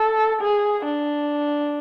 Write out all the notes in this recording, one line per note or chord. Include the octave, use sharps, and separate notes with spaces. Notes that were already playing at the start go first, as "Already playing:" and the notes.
Already playing: A4
G#4
D4